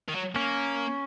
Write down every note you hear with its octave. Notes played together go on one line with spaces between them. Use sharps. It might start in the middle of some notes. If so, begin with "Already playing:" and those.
D#3
F#3
A#3 C#4